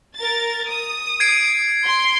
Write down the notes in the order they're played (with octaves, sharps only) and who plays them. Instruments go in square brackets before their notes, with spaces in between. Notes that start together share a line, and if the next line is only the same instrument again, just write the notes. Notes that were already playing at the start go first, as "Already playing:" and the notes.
[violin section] A#4 A6
D#6
[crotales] G#6 C7 D7
[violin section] C6